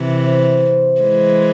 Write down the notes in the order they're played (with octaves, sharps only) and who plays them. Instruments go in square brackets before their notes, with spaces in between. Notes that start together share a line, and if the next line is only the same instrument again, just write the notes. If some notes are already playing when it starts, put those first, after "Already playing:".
Already playing: [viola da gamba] C3 E3
[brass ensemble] C5
[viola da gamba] E3 G#3